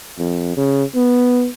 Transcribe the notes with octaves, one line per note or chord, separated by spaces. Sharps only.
F2
C#3
B3